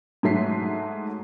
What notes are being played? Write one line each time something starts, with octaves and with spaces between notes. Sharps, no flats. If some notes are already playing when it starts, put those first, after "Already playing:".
G#2 F#3 A3 B6 C7